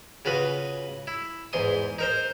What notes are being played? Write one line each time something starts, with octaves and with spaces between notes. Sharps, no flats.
C#3 F4 F#4 B4 D#6
E4
E2 G#2 C6 D#6
D#4 A#4 C5